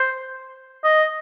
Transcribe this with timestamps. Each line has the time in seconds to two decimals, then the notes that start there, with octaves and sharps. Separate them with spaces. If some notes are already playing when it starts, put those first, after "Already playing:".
Already playing: C5
0.84 D#5